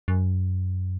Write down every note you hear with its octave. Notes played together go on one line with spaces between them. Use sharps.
F#2